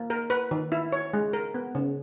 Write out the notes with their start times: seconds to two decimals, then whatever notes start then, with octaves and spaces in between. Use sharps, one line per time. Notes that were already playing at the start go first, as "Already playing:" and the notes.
Already playing: A#3
0.10 A#4
0.30 B4
0.51 D#3
0.72 E4
0.92 C#5
1.14 G#3
1.33 A#4
1.54 B3
1.75 C#3